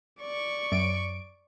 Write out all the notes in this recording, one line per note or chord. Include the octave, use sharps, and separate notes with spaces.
D5 C#6
F#2 D7